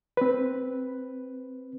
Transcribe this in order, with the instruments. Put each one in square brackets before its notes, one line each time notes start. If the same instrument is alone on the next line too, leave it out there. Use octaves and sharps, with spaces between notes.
[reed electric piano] C4 B4